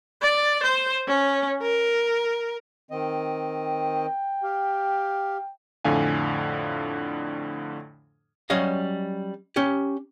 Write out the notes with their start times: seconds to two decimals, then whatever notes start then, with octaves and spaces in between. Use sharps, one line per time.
0.21 D5
0.63 C5
1.08 C#4
1.62 A#4
2.91 D#3 C4 D#5
3.66 G5
4.43 G4 F5
5.84 F2 A2 D3 F5 G#5
8.50 F#3 G3 C#4 D#5 F5
9.56 C#4 G4